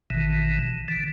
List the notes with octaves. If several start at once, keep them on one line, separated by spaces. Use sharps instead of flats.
A1 B2 D#3 E3
D3 E3